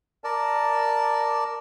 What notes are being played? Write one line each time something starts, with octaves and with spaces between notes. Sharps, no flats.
A#4 D5 A5